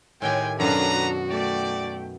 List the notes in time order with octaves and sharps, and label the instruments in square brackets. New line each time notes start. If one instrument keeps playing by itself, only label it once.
[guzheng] A2 D#3 G4 [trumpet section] G#3 G5 [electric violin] G#5
[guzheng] F#2 B2 F5 [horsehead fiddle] D4 A4 [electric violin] F#4 [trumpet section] B4 A#5
[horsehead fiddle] A3 G5 [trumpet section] D5